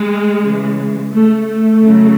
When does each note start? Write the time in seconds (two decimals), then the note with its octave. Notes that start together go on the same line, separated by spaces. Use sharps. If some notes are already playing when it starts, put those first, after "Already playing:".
Already playing: G#3
0.41 C#3 E3
1.12 A3
1.47 A3
1.83 C#3 F#3